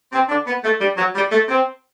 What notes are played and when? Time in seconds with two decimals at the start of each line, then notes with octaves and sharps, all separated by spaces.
0.12 C4
0.29 D4
0.46 B3
0.63 A3
0.80 G3
0.97 F#3
1.15 G3
1.32 A3
1.48 C4